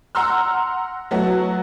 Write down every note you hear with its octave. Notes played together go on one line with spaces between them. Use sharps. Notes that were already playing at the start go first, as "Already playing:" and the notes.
F#5 A#5 C6 E6 F6
F#3 A3 B3 F#4